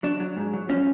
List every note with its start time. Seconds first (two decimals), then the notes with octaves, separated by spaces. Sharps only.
0.03 F#3 D4
0.20 F#3
0.37 G#2
0.53 F#3
0.69 F3 C#4